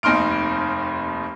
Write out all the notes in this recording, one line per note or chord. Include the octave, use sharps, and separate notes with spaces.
F1 D#2 D#4 C6 F6 D7